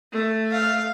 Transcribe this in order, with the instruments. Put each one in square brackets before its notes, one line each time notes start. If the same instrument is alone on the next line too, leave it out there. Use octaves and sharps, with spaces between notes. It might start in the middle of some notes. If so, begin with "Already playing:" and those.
[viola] A3
[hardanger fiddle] F5